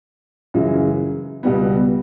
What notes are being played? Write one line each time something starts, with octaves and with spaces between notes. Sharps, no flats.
F#2 C#3 E3 G#3
C#2 B2 G3 B3